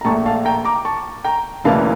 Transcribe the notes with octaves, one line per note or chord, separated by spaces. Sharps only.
A#5
A#1 A#2 A3 A5 C#6
F5 A5
G5 A#5
A#5 D6
A5 C#6
G5 A#5
E1 D2 C#3 E3 A#3 F5 A5